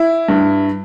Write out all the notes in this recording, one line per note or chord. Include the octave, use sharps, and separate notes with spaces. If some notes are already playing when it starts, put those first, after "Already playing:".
Already playing: E4
G2